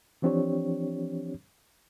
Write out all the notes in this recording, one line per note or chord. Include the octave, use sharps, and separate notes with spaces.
E3 F3 C4 D4 G4 C#5